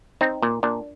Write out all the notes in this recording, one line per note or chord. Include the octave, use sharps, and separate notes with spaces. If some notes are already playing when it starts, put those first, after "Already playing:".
C4 D#4
A#2
A#2 D4